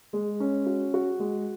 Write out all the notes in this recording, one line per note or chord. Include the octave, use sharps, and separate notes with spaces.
G#3
C#4
F#4
F#4
G#3